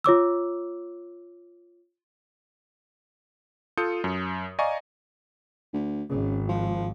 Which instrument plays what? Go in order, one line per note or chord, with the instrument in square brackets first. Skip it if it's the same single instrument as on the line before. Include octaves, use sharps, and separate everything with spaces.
[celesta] F4 C#5 D6 E6
[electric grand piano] F4 A4 D#6 G6 C#7
F#2
D5 D#5 F5 G#5 A#5 C#6
[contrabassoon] D2
[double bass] G#1 [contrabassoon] C#3
[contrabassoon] F3